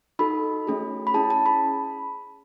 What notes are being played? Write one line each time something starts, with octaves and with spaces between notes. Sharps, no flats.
D#4 F#4 A4 B5
A3 C#4 G#4
B5
C#4 E4 G#4 A5
A5
B5